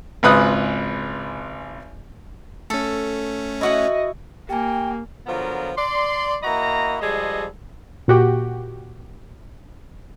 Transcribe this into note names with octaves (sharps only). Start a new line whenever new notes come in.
G#1 C#2 B4 D#6 F#6
A3 C#4 A4
E4 F#4 D#5 F#5
A#3 G4 G5 G#5
D3 F3 F#3 B3 F4 A#4
D5 C6
A#3 E4 F#4 D#5 A#5
F3 G3 G#3 G#4 A4 D#5
A#2 F#4 G4